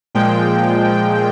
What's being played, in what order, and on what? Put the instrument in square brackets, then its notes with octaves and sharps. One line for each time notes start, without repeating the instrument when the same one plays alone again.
[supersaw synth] A#2 F3 G#3 G5